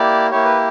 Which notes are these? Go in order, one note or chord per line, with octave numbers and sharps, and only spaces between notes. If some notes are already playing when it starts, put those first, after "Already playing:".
Already playing: A#3 E4 G4 D5
A#3 E4 G4 C#5
B4